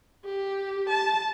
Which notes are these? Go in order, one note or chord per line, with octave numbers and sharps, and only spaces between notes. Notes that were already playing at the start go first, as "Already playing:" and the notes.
G4
A5